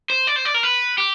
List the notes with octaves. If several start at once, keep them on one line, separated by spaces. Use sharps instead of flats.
C5
D5
C5
D5
A#4
B4
G4